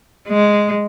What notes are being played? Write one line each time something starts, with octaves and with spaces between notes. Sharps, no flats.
G#3